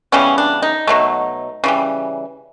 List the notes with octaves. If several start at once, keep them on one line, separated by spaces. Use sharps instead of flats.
C#3 E3 G3 B3 C#4
D4
D#4
B2 F#3 A3
C#3 E3 G3